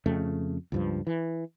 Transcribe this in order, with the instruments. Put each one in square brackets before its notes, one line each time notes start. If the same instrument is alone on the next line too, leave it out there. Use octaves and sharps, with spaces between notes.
[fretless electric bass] F2 C#3 A3
C#2 G2 F3
E3